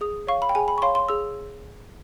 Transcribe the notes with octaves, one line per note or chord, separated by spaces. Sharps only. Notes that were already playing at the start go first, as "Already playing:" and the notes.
G#4 D#6
C#5 F5 C#6
B5
G5
G#4 G#5
B5
C#6
C#5 F5 C6
C6
G#4 E6